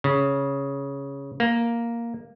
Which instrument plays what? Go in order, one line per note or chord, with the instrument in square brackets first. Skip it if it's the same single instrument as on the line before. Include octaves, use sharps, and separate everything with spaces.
[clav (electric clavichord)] C#3
A#3